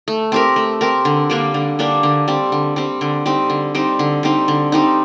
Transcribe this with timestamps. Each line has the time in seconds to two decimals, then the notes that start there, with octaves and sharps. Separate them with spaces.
0.08 A3
0.32 C4 G4 A#4
0.56 A3
0.81 C4 G4 A#4
1.05 D3
1.30 G3 A#3 D4
1.54 D3
1.79 G3 A#3 D4
2.03 D3
2.28 G3 C4
2.52 D3
2.76 G3 C4
3.01 D3
3.26 G3 C4 D#4
3.50 D3
3.75 G3 C4 D#4
3.99 D3
4.23 G3 C4 D#4
4.48 D3
4.72 G3 C4 D#4